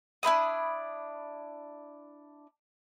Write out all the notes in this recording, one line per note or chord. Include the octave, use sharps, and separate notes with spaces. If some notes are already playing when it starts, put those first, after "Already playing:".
D4 E4 B5 D#6